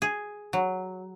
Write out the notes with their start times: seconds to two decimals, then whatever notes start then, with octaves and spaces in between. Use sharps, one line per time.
0.02 G#4
0.53 F#3